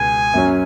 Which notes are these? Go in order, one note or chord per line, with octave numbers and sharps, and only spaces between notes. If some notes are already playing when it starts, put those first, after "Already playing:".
Already playing: C#2 B2 B3 G#5
F#2 F#3 C#4